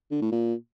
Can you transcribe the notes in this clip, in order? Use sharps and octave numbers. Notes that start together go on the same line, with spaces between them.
D3
A2
A#2